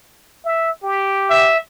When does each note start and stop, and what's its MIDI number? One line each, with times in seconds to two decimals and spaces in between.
0.45 0.70 76
0.83 1.52 67
1.30 1.57 76